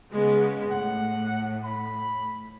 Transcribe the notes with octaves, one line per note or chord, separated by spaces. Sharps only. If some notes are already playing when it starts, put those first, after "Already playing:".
C#3 G#3 B3
A2 F#5
B5